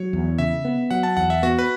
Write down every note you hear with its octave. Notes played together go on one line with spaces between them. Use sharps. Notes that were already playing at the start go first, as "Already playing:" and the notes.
Already playing: F#3 C#5
E2
C#3 E5
B3
F#3 F#5
A5
E2 F#5
E5
B3 F#4
B4